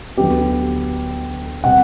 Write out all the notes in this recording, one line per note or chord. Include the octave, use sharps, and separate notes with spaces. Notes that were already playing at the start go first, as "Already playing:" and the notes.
D2 D3 F#3 B3 G4
C3 G3 F#5